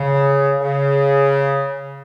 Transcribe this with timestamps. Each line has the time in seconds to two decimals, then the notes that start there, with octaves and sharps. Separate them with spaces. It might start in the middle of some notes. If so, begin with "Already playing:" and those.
Already playing: C#3
0.61 C#3